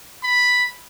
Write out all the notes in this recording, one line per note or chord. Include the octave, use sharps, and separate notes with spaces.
B5